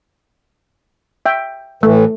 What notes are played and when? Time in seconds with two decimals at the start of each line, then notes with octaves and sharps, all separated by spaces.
1.26 E5 G5
1.83 A2 E3 A3